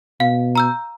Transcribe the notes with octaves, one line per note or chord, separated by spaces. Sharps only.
B2 F5
A#5 E6 G6